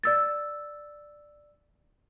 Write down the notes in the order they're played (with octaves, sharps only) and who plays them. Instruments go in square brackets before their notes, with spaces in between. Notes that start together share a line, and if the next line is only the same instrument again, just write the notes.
[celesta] D5 E6 A6